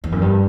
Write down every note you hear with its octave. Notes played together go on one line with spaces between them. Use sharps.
E2
F#2
G2